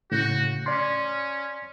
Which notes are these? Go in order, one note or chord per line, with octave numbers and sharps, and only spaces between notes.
A2 C#3 F#4 G6
C#4 D5 C6